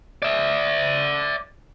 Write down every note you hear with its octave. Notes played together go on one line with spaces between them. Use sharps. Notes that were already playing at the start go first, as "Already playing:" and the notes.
D5 E5